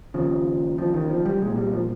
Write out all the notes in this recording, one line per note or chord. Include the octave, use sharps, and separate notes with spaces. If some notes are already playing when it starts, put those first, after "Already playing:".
D#2 C#3 F3
F3
D#3
F3
G3
C2 A#2 G#3
G3
F3